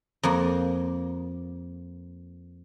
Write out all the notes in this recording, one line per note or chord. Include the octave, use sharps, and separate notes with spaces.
F2 A#3